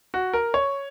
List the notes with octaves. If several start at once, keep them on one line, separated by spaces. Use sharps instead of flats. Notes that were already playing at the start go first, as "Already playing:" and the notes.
F#4
A#4
C#5